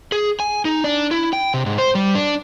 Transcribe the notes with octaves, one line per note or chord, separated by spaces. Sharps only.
G#4
G#5
D#4
D4
E4
G5
C3
G#2
C5
G3
D4